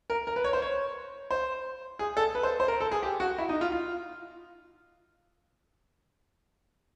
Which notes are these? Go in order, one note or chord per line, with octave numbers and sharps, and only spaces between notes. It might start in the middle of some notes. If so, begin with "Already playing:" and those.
A#4
A#4
B4
C#5
C5
C#5
C5
G#4
A4
B4
C5
C5
A#4
A4
G#4
G4
F#4
E4
D#4
F4
F4